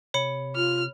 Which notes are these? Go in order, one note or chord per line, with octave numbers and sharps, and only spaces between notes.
C3 C#5 B5 C#7
F4 F6